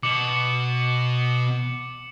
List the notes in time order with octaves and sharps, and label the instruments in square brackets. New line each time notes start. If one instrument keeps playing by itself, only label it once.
[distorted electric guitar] B2 [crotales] D6 C#7 F#7